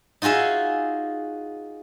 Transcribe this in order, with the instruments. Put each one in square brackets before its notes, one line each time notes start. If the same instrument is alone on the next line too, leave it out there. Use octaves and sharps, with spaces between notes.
[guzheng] D#4 F4 F#4 G#4 E5